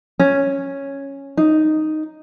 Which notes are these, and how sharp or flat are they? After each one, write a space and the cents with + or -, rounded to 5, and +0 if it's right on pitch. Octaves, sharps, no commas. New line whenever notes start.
C#4 -5
D#4 -5